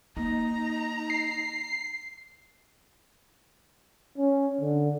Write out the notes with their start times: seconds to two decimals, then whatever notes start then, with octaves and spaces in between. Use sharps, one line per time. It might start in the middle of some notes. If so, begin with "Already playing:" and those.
0.17 A#3 D#4 A#5
1.10 C7
4.18 C#4
4.61 D3